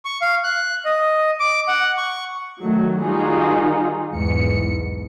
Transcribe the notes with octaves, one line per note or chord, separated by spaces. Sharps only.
C#6
F5
F#6
D#5
D6
F#5
C#6
D#3 F#3 A3
D#3 G3 D#4 F4 F#4 G#4
B1 E2 G#2 C#7